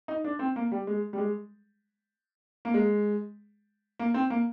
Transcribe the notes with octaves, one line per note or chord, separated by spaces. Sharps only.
D#4
D4
C4
A#3
G3
G#3
G3
G#3
A#3
G#3
A#3
C4
A#3